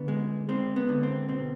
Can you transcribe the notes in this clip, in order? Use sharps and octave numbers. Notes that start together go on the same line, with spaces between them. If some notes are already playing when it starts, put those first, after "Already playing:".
Already playing: D3 B3
G#3
G#3 C4
B3
D3
C4
B2 C4